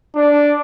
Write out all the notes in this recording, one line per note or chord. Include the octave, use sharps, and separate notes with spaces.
D4